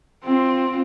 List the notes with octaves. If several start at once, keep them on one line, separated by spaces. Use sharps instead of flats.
C4 F4